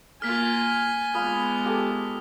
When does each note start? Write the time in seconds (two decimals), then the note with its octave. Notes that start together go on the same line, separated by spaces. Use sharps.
0.22 A#3 F4 G#5 F6 B6
1.14 G#3 B3 F4 B4 D5 D#6 F6
1.64 F4 G4 A4